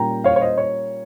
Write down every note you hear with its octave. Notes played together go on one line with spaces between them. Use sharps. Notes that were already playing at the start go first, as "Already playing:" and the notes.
Already playing: A#2 G3 A#3 C#4 G5 A#5
C#5 F5
C#5
C5 D#5
C#5